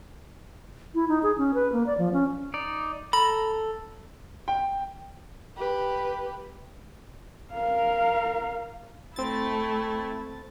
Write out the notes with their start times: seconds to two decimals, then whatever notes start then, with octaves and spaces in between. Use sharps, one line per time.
0.95 E4
1.08 D#4
1.23 G#4
1.38 C#4
1.54 B4
1.73 A#3
1.86 D5
1.98 F3
2.13 C#4
2.54 D#4 D5
3.13 A4 A#5 B5
4.48 G5
5.57 G4 B4
7.53 A#4 F5
9.16 A3 C4 E4 A6